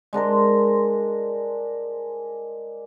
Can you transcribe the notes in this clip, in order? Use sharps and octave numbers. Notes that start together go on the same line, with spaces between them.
G#3 D4 A#4 C5